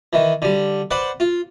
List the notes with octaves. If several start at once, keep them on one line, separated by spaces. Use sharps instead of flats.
D#3 E3
D3 G3
B4 C5 D5 F#5
F4